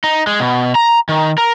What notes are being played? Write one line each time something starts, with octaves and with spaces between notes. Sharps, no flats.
D#4
G#3
B2
A#5
D#3
A#4